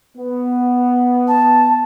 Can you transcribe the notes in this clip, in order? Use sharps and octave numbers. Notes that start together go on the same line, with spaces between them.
B3
A5